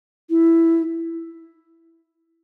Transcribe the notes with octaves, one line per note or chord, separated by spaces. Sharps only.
E4